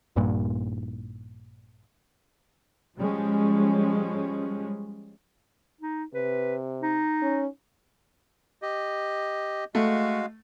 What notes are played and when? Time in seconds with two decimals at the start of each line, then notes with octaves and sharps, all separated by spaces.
0.16 A#1 G2 A#2
2.97 F3 G3 G#3 C#4
5.81 D#4
6.14 C3 B4
6.82 D#4
7.22 C#4
8.62 G4 D#5
9.75 G#3 A3 F#4 F5